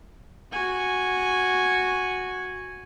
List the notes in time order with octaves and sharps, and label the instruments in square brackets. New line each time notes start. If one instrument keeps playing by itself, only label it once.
[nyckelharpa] F#4 G#5